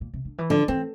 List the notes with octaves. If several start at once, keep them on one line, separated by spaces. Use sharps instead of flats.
A#2
C3
D3
E3
D3 F3
E3 C4